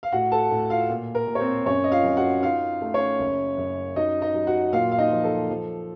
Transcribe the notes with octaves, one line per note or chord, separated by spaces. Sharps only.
F5
A2 F#4 F#5
A4 A5
A2
F4 F5
A#2
A#4
A#2
C#5
C4 C5
F#2 C#4 C#5
D#5
F4 F5
F#2
F#4 F#5
D#4 F4 F5
A3
C#4 C#5
F#1
F#2
F#3 D#4 D#5
D#4 D#5
F#3
F#4 F#5
A#2 F4 F5
F5
D#4 D#5
F3
A4
F3